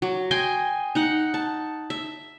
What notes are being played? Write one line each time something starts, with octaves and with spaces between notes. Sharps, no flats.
F#3
D#5 G5 G#5 C6
D#4 F#5
A5
E5